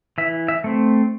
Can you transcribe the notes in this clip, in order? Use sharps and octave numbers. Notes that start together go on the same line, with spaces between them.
E3 E5
E5
A3 C4